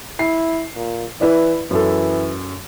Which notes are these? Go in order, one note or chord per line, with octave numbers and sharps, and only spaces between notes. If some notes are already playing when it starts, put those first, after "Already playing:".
E4 C7
A#2
E3 E4 B4 D5
F#2 E3 A4